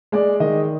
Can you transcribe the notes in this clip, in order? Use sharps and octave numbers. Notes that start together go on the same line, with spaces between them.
G#3 D5
D#3 D#5